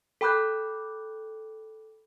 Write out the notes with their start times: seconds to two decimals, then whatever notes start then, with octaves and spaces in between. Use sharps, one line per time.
0.21 A4 G5 B5 D6 F#6 G6